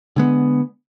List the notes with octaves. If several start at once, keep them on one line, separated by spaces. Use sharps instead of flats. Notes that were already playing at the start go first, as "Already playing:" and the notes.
D3 G#3 B3